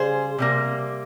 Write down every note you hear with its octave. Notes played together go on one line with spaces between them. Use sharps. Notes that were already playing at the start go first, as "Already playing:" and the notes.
Already playing: C#3 G3 G#4 C5
C3 G3 A#3